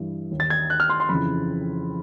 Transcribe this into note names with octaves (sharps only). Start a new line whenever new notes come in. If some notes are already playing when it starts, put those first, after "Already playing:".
Already playing: G2 E3
D#2 D#3
A6
G#6
F#6
F6
C6
C6
F2 C#3 E3 B5